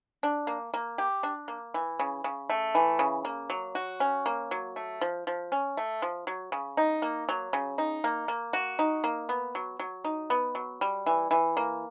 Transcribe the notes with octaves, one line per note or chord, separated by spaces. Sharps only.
D4
A#3
A#3
G4
D4
A#3
E3
C#3
C#3
A3
E3
C#3
A#3
F#3
F#4
C#4
A#3
F#3
A3
F3
F3
C#4
A3
F3
F#3
C#3
D#4
A#3
F#3
C#3
D#4
A#3
A#3
F#4
D#4
A#3
B3
F#3
F#3
D#4
B3
F#3
G3
E3
E3
A#3